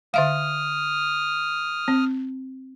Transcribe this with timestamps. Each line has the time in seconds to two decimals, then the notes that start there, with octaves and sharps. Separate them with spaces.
0.14 D3 E5 F5 D#6 F6
1.88 C4